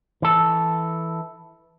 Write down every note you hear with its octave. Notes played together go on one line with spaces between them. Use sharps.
E3 A4